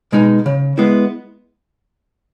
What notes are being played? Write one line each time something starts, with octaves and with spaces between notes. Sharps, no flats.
B2 G#3 D#4
C#3
G#3 B3 E4